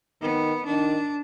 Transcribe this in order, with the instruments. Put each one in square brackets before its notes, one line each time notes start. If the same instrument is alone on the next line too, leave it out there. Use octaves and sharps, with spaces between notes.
[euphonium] D#3 [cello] B3
[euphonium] D#3 [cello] D4